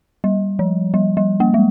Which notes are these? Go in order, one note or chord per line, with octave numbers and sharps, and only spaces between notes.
G3
F3
G3
G3
A#3
G#3